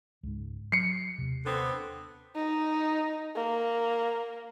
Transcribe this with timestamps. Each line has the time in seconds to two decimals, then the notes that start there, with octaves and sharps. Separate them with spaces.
0.23 C#2 G#2
0.72 F#3 C7 C#7
1.18 D#2 C3
1.45 D3 B3 C4
2.36 D#4
3.36 A#3